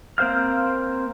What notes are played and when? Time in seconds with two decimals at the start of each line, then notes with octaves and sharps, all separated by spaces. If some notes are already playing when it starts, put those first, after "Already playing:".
0.18 A#3 C4 C5 F5 F6